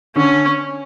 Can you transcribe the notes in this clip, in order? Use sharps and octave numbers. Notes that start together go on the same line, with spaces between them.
D3 C#4